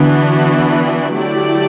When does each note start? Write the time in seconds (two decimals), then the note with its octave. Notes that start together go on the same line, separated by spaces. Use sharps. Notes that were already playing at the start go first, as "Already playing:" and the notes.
Already playing: D3 E3 B3 D4 F#4
1.13 F#3 A3 E4 G4 D5